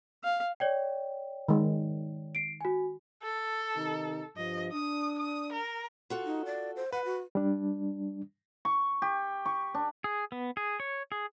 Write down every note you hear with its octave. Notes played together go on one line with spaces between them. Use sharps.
F5
C#5 D5 G5
D#3 G#3
C7 D7
F#4 G#5
A4
C3 D#3 D#4
G2 F3 D#5
D4 D#6
D#6
A#4
F4 F#4 A4
D#4
D5
C5
B4 F#5
F#4
G3 D4
C#6
G4
C#6
D4
G#4
B3
G#4
C#5
G#4